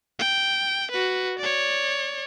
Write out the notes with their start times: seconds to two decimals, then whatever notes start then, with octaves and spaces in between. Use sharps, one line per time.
0.19 G5
0.91 F#4 B4
1.39 C#5 D5